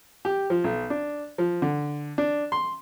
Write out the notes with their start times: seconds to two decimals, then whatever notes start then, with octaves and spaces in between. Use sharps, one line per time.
0.25 G4
0.50 F3
0.64 B1
0.90 D4
1.38 F3
1.62 D3
2.18 D4
2.52 C6